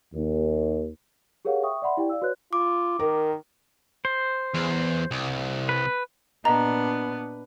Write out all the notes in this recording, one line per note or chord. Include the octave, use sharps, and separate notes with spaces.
D#2
G4 G#4 A#4 C#5 F5 F#5
E5 G5 C#6 D#6
D5 E5 F#5 B5 C6
E4 G4 D5 G5
D5 F5 E6
F#4 B4 C#5 F#6
F4 D6
D#3 A#4
C5
E2
C2
B4
A#2 B3 D4 D#5 A#5